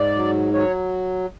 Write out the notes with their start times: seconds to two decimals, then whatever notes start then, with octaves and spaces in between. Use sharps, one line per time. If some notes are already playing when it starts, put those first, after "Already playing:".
Already playing: G#2 D5
0.15 F#3
0.53 F#3 C#5